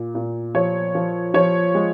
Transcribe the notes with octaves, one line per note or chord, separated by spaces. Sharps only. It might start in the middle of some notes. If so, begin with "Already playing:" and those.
Already playing: A#2
A#2
F3 C#5
F3
F3 C#5
G#3